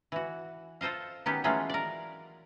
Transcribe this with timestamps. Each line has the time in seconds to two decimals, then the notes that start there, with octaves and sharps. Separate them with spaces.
0.12 E3 F#4
0.81 F4 A4 C5 D#5 F5
1.26 D#3 F#3 B3 C#4 G4
1.44 E3 F#3 G#3 A3 C#4 F4
1.69 A#4 D5